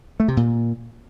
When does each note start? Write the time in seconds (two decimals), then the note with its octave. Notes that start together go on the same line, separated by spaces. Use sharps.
0.20 A3
0.28 C3
0.37 A#2